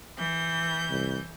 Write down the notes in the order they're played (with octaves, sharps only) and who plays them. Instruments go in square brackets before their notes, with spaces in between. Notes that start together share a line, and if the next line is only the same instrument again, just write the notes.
[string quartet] E3 G6
[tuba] C2